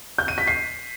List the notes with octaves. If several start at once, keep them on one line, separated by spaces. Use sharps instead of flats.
G6
D#7
B6
C7